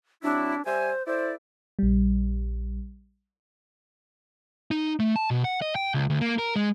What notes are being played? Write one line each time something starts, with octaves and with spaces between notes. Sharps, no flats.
F#3 C4 D4 E4
G3 C5 E5 G#5
E4 A4 C5 D5
A#1 G3
D#4
A3
A5
B2
F#5
D#5
G5
C#2
D2
A#3
A#4
G#3